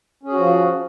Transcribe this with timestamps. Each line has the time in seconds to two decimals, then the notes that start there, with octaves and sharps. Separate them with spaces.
0.23 C#4
0.28 G#4
0.33 F#4
0.37 F3